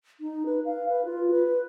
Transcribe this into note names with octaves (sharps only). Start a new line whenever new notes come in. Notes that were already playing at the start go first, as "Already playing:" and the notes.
D#4
B4
F5
B4
F4
B4